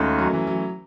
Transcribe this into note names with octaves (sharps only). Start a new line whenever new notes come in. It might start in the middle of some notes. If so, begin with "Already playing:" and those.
Already playing: D#2 D#3 G#3 A3 C#4 D#4 F#4
F#3
E3
F#3